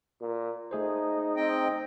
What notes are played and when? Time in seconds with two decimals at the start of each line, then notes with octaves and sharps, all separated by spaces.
0.21 A#2
0.71 A3 D#4 G#4 C5
1.36 C4 D#5 G5